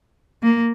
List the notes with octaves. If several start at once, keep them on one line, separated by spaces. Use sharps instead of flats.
A#3